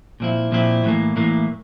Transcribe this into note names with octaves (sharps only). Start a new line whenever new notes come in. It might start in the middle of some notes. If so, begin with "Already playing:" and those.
A#2 F3 C4 E4
A#2 F3 C4 E4
A2 E3 A#3
A2 E3 A#3